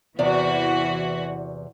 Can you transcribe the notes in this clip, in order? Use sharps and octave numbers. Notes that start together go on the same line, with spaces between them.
E2 C3 E3 F#4 D5